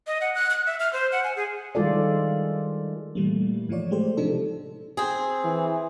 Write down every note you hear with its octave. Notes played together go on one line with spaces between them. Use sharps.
D#5
F#5
F#6
F#6
E5
F6
C5
F#5
G#5
G#4
D#3 G3 G#3 F4 A4 D5
A#2 E3 G3 A3 A#3
A2 E3 F3 F4 C#5 D5
G#3 A3 G4 A4 C5 D5
C3 F3 C4 D4 D#4 A4
C4 G#4
E3